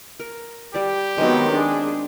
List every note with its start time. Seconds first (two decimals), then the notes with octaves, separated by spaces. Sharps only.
0.20 A#4
0.74 G3 G4 D5
1.18 D#3 F#3 G#3 B3 C4 D#4
1.50 D4 G#4